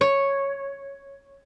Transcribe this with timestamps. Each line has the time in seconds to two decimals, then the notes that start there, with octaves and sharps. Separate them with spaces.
0.01 C#5